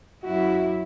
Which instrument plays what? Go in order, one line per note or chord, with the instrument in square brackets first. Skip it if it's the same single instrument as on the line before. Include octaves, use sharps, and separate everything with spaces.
[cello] F#2 E4 [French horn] F#4